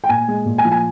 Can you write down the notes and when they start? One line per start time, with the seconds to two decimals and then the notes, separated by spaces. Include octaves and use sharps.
0.04 G5
0.09 A#2 G#5
0.28 G#3
0.46 A#2
0.58 G#5
0.65 F3
0.72 G#5